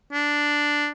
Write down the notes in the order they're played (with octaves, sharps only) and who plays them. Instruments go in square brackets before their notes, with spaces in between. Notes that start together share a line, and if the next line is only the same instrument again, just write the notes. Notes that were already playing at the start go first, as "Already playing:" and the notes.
[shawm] D4